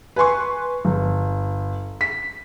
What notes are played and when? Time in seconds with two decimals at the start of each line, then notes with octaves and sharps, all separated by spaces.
0.16 B4 G#5 C6 C#6
0.85 G1
2.01 B6